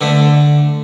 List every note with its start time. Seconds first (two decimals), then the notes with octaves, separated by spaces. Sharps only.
0.01 D3 A3